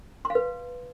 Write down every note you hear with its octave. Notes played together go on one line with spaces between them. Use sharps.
C6
F5
B4